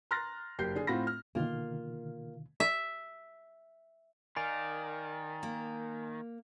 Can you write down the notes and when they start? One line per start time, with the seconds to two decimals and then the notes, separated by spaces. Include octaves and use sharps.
0.11 A#5 C6 F6 F#6 A6 A#6
0.59 F#1 G4 A#4 G6 C7
0.75 D3 D4 G#4
0.87 A2 C4 F4 F#5 B5 A#6
1.07 F6
1.35 B2 D3 D#3 A#3 F4
2.60 E5
4.37 D#3 A#4 D5 F5 G#5
5.43 A#3